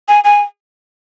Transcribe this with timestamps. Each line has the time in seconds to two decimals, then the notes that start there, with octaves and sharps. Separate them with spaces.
0.08 G#5
0.24 G#5